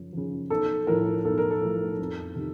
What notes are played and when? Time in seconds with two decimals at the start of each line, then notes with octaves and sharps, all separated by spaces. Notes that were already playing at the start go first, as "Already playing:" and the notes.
Already playing: F#2 C#3 F3
0.13 C#3 F3
0.50 B1 A4
0.87 A2 F3 A3 A#4
1.25 B1 A4
1.38 A#4
1.51 A4
1.61 A2 F3 A3
1.99 F2
2.36 C3 D#3